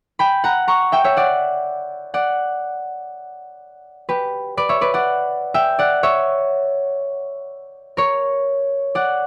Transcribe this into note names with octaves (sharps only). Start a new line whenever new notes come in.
G5 B5
F#5 A#5
A#5 C#6
E5 G5
C#5 E5
D5 F#5
D5 F#5
G4 B4
B4 D5
C#5 E5
B4 D5
D5 F#5
E5 G5
D5 F#5
C#5 E5
A#4 C#5
D5 F#5